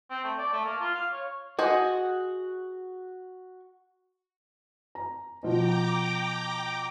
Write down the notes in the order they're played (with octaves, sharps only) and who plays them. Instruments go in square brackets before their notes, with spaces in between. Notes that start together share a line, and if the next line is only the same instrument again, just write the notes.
[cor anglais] C4
A3
D5
A3
A#3
F4
F5
C#5
[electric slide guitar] F#4 [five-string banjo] G#4 C5 D#5
[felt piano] A#5
[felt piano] B2 F3 [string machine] G5 A#5 D6